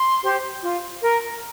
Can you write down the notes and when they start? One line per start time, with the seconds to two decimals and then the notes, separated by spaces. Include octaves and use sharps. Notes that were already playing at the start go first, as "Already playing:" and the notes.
Already playing: C6
0.22 G4 C5
0.62 F4
1.02 A#4